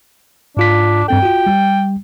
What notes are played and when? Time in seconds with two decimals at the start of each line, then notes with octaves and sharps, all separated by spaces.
0.57 G#2 D4 F4 B6
1.08 G2 C4 A4 G5
1.23 F4 F#4
1.46 G3